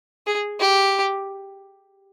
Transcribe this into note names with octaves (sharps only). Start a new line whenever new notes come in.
G#4
G4